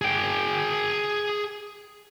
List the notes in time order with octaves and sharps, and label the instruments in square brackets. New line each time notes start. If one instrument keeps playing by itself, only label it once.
[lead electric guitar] G#4 G5